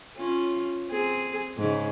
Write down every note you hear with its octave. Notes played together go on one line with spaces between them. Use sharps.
C#4 F4
C4 G#4
G#2 C#3